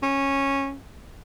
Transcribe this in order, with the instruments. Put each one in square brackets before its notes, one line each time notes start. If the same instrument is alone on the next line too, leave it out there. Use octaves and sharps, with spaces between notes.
[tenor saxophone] C#4